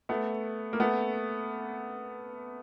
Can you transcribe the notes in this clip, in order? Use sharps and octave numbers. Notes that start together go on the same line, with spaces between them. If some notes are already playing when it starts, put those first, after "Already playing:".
A3 B3
A#3
A3 B3